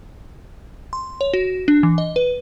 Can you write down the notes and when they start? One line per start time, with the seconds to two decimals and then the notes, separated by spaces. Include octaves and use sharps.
0.93 C6
1.21 C#5
1.34 F#4
1.68 D4
1.83 E3
1.98 D#5
2.16 B4